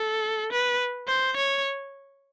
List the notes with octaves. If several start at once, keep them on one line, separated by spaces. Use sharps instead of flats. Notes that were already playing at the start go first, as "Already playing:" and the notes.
Already playing: A4
B4
C5
C#5